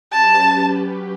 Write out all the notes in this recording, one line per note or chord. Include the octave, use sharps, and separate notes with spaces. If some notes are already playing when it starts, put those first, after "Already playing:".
F#3 C#4 G4 B4 A5